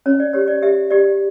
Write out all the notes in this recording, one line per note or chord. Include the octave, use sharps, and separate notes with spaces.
C#4 C#5
D5
G4 C#5
D5
G4 E5
G4 D5